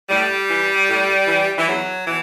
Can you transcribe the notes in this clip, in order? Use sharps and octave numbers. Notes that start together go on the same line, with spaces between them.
A2 G3
E3
A2
E3
E3
E2 F#3
B2 E3